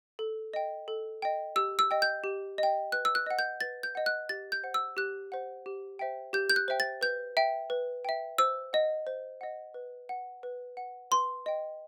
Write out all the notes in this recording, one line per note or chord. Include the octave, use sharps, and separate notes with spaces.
A4
D#5 G5
A4
D#5 G5
G4 E6
E6
D#5 G5
G6
G4
D#5 G5
B4 F#6
E6
F#6
D#5 F#5
G6
B4 A6
G6
D#5 F#5
F#6
G4 A6
G6
C5 F#5
E6
G4 F#6
C5 F#5
G4
C5 E5 G5
G4 G6
G6
F#6
C5 E5 G5
A6
B4 G6
E5 G5
B4
E5 G5
C5 E6
D#5 F#5
C5
D#5 F#5
B4
F#5
B4
F#5
B4 C6
D#5 G5